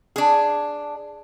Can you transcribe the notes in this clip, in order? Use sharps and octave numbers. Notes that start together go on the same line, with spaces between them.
D4 G#4